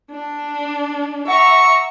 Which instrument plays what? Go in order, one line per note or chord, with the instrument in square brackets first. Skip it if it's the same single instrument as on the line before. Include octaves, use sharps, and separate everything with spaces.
[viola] D4
[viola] E5 A#5 [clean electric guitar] F#5 [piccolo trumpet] C#6